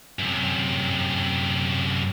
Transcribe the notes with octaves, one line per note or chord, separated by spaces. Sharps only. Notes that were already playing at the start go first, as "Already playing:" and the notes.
F#2 C3